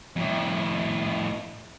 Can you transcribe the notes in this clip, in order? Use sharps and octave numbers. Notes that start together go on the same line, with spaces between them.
F2 A2